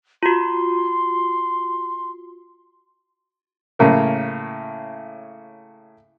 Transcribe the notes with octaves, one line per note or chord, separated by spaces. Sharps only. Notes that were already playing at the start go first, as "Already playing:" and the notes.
F4 F#4 C6
A2 C#3 A#3